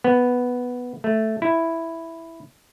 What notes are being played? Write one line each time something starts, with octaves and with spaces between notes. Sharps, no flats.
B3
A3
E4